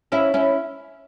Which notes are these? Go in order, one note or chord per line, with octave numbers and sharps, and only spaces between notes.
C#4 E4
C#4 E4